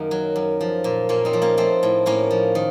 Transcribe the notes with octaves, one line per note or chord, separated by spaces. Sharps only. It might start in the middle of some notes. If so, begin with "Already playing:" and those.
Already playing: F#2 D#3 A#3 D#4
F#3
F#2
F3
A#2
A#2 A#3 C#4
C4 D#4
F3
A#3 C#4
F3 A3 C4
A2
A2 A#3 C#4
F3
D#3